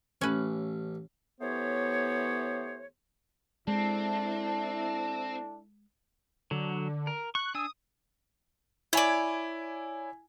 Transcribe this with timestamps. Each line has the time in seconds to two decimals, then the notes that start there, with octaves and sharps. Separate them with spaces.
0.21 A1 C#4 B4
1.41 E3 A3 B3 G4 C5 C#5
3.67 G#3 C4 D4 E4 A4
6.51 D3 F#3
7.07 A#4
7.35 C#6 F#6
7.55 D4 G#5 D#6 E6
8.93 E4 C#5 D5 G#5